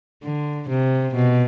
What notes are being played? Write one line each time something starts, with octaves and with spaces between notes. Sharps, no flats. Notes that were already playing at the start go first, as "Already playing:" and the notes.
D3
C3
B2